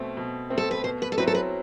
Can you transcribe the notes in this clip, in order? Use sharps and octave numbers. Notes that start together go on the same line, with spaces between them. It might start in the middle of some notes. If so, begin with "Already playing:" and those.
Already playing: B2 A3 C4
B2
A3 C4
A4
B4
B2 C5
B4
A4
F#3 C4 E4 B4
A4
B4